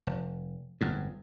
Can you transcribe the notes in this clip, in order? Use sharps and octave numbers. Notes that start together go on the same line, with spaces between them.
F1
G1 F2 G#2